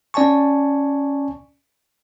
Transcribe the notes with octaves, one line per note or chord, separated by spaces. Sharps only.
C#4 D5 G#5 A5 C#6